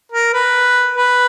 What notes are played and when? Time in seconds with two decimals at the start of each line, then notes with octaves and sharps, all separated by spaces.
0.12 A#4
0.34 B4
0.96 B4